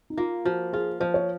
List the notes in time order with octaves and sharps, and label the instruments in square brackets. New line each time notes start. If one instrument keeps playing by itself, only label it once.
[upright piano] D#4
[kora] A#3 [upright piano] F4
[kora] F3 [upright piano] F#4
[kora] F4 [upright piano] G#4
[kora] F3 [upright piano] C5
[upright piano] C#5